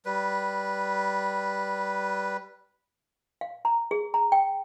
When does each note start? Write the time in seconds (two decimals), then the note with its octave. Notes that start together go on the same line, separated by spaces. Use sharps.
0.05 G3 B4
3.41 F5
3.65 A#5
3.91 G#4
4.14 A#5
4.32 G5